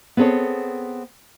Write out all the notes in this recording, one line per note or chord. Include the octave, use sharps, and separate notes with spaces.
B3 C4 G#4 A4 C#5